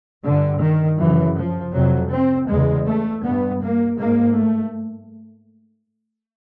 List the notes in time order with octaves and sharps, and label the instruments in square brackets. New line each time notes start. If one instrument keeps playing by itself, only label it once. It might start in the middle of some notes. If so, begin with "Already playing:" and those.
[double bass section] G2 D3
D#3
F#2 C#3 E3
F3
F2 C3 F#3
C4
E2 C#3 G#3
A3
G2 B3
A#3
G#2 A#3
A3